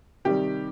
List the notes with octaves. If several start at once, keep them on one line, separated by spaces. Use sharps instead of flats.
C3 D#3 G3 G4